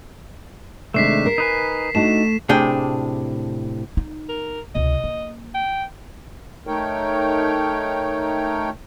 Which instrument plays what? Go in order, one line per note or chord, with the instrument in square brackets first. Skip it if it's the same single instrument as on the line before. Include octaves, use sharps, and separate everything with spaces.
[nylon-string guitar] C3 D#3 G#3 [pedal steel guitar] A3 D4 [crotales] B6 C7 E7
[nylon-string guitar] A#4
[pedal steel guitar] D#4 B4 G#5
[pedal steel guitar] A3 [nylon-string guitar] D4 D#4 F#4 [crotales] E7
[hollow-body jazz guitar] A2 C3 D4 G#4 G5
[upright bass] D#4
[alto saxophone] A#4
[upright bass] C#2 C3 [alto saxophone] D#5
[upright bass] A#3
[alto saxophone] G5
[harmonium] A3 D#4 A#4 C#5 G5